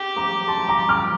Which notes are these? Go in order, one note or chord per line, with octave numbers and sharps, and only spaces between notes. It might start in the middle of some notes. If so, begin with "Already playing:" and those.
Already playing: G4
A#5 D6
A5 C6
A#5 D6
D6 F6